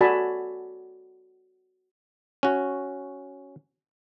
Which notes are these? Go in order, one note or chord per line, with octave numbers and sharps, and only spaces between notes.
F#4 A4 D5 G#5 A5 B5
C#4 F#4